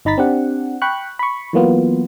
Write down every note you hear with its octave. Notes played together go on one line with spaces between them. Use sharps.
G1 D#4 A#5 B5 A6 B6
C4 D4 G4 F#5
G5 B5 C#6 F#6
B5 C#6
E3 F#3 A#3 B3 F4